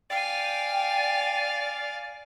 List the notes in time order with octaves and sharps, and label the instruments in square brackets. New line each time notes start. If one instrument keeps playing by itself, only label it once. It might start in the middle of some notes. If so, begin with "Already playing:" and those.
[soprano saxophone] D5 [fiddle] F5 G#5 [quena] G5